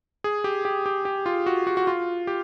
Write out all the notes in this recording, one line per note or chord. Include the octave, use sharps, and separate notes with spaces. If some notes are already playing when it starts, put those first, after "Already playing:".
G#4
G4
G4
G4
G4
F4
F#4
F#4
F#4
F4
G4